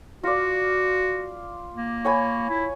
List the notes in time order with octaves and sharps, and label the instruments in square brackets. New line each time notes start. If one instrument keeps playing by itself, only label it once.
[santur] F4 D5 [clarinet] F#4
[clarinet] A#3
[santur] C#5 G#5 B5
[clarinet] E4